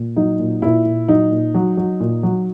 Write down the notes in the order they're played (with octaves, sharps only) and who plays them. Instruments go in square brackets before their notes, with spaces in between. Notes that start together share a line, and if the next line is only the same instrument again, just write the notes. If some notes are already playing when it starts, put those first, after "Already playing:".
Already playing: [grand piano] A#2
F#3 D#4
A#2
A#2 E4
A#2
F#3 D#4
A#2
F#3
F#3
A#2
F#3